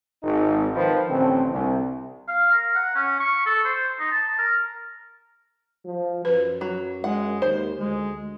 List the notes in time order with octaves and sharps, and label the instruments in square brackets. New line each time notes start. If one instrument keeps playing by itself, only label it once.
[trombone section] G#1 D#4
D#3 F3 B4 C5
A1 D3 C4
C2
[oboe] F5
A#4
F#5
C#4
C#6
A4
C5
D#4
A5
A#4
[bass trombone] F3
[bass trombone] F#2 [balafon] B4
[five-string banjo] F#3
[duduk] G#3 [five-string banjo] F#5
[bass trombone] D#2 [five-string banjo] C5
[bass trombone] D2 [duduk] G#3